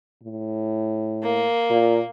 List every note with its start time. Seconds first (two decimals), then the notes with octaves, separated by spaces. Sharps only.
0.23 A2
1.23 A#3
1.70 A#2